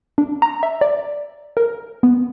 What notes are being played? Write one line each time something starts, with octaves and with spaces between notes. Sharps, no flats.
D4
A#5
E5
D5
A#4
B3